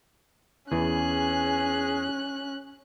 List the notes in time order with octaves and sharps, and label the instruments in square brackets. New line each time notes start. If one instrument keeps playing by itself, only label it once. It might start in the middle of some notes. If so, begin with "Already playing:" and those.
[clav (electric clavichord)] E2 E3 [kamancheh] C#4 F#6 [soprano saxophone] G#4